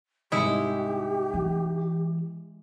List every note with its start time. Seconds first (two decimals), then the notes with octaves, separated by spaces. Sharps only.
0.32 C2 G#2 G#3 E4 G4 C#7
1.34 E3